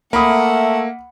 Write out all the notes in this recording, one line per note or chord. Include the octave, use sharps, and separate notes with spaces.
A3 A#3 E5 F#5 B5 D#6